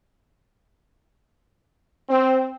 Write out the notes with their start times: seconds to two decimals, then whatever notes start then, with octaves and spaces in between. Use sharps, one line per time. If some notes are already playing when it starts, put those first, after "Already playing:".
2.09 C4